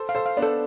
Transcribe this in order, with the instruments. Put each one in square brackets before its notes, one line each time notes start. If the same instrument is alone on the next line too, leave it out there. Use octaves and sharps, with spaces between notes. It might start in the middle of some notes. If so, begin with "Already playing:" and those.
Already playing: [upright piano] A4 C5
[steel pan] F5
[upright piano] A4 C5
[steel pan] F5
[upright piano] B3 D4
[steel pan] A4